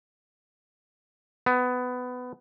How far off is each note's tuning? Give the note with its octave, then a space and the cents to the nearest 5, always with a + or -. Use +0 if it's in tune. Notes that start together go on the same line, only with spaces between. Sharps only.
B3 +15